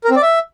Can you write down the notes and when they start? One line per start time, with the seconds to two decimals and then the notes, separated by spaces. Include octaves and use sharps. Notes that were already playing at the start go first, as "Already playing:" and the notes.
0.04 A#4
0.10 C4
0.16 D5
0.22 E5